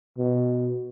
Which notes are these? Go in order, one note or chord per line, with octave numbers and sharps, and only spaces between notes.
B2